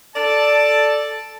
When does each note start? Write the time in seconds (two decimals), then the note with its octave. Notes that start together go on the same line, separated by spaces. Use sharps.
0.15 A4 D5 A5